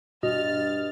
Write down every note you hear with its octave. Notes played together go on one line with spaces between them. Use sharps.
G2 B2 D#5 F6 A6